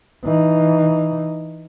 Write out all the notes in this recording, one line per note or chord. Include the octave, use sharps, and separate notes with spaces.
E3 D#4